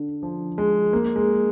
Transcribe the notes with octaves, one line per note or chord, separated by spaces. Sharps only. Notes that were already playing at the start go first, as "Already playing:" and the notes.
Already playing: D3
F3
G#3
A#3
G#3